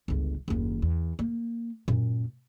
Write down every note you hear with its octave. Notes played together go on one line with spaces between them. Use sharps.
G1 C#2
F#1 D#2
E2
A#3
F#2 A#2